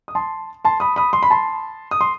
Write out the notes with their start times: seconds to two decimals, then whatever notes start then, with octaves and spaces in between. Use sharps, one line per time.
0.08 D#6
0.15 A5 C6
0.65 A5 C6
0.80 B5 D#6
0.96 B5 D#6
1.13 C6
1.23 B5
1.30 A5 C6
1.91 D#6
2.01 C6